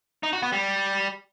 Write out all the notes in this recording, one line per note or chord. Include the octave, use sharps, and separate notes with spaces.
D#4
F#4
B3
G3